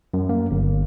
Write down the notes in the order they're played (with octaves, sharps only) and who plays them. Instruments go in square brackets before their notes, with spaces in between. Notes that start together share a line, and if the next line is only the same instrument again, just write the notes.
[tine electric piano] F#2
A#3
G1